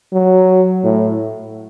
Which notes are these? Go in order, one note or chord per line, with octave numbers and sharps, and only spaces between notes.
F#3
A2